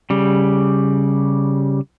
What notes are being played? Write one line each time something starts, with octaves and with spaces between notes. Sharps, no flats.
C#3 G3